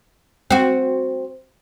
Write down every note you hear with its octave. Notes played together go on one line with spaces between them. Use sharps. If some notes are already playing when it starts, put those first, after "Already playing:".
C4 F#4